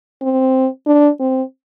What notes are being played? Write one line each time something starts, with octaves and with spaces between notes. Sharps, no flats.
C4
D4
C4